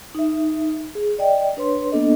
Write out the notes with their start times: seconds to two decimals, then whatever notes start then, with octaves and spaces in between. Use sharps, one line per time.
0.15 D#4 E5
0.95 G#4
1.18 D5 D#5 G5
1.57 D4 B4 C#5 C6
1.92 A#3 B3 D4 A4 D#5